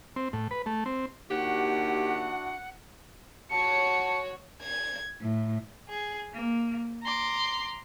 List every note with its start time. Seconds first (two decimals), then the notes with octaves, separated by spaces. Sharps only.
0.16 C4
0.33 A2
0.51 B4
0.66 A3
0.86 C4
1.30 D#2 D4 E4 F#4 G4 F#5
3.51 F#4 C#5 A5 C#7
4.61 G#6
5.21 A2
5.89 G#4
6.34 A#3
7.04 A#5 C6 D6